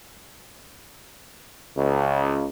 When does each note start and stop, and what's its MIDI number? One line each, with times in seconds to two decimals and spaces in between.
1.77 2.47 37